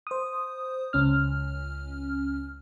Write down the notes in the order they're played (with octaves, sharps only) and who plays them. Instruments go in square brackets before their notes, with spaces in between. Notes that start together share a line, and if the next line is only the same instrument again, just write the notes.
[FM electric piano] C5 D#6
C#2 C#4 F6